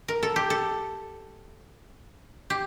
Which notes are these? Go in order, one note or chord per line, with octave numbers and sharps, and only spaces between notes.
A#4
A4
G4
A4
G4